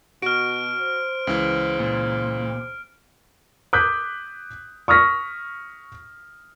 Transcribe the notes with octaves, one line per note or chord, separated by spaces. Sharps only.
B2 F#4 F6 D7
C5
C#2 E3
A#2
D6 D#6 F#6 G6 B6
C#6 D#6 F6 A#6 B6